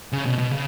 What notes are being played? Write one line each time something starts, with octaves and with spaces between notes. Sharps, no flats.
C#3
B2
B2
C#3